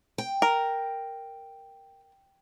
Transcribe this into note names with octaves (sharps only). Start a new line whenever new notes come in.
G5
A#4